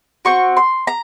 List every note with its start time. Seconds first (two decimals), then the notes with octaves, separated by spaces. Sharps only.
0.25 C4 F#4 C#6
0.57 C6
0.87 A#5